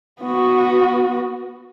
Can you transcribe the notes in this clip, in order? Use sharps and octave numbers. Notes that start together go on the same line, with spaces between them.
B3 F#4